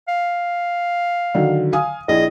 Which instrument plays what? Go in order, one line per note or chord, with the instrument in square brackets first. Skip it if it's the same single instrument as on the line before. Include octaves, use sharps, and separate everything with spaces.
[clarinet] F5
[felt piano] D3 D#3 F#3
F5 G#5 D#6
[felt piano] A#1 E4 G#4 [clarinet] D#5